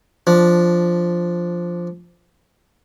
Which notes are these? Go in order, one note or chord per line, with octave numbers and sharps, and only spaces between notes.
F3 D4